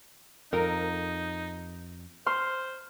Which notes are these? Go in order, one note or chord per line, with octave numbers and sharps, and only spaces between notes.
F2 D#4 A#4
C5 C6 F6